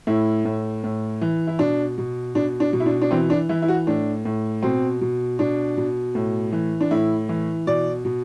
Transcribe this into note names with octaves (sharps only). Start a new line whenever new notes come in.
A2 E4
A2
A2
E3
E4
B2 D4
B2
B2 D4
D4
B2
E4
D4
D4
E3 C4
D4
E3 E4
E4
F#4
A2 D4
A2
B2 C4
B2
B2 D4
B2
A2
E3
D4
A2 E4
E3
B2 D5
B2